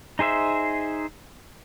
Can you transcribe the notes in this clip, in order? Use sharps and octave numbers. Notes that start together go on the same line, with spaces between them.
D#4 G#4 C5 E5